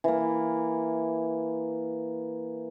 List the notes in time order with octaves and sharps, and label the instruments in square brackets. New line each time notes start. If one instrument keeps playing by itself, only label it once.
[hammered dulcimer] E3 A#3